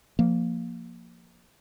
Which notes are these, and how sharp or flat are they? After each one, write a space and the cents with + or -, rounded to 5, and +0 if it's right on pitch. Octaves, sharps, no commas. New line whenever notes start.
F3 +0 A#3 +0